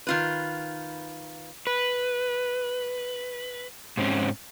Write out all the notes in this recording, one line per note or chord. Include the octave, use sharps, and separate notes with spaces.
D#3 F4 B4
B4
G#2 C4 C#4